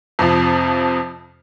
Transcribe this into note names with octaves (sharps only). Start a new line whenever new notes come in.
F2 C3 F3